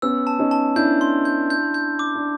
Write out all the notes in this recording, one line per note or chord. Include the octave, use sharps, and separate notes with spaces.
B3 C#4 E6
A5
C#4 D#4
A5
D4 E4 G6
C6
G6
G6
G6
D6
D4